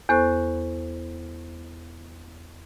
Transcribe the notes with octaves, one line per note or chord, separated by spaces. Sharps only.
E2 B3 A4 C5 C#6 F#6